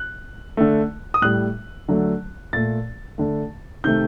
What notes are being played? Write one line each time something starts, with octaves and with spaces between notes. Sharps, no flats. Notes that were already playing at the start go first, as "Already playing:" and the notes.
Already playing: F#6
D3 A3
D#6
A2 G3 F#6
D3 F#3 A3
A#2 A3 A6
D3 A3
C3 D#3 A3 G6